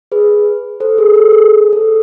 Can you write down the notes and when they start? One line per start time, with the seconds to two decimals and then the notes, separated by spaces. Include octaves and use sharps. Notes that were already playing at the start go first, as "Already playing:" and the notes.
0.12 G#4 B4
0.80 A4 C5
0.97 G#4 B4
1.15 A4
1.32 G#4
1.73 A4